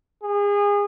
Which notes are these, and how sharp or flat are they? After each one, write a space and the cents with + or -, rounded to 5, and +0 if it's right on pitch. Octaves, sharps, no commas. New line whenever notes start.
G#4 -30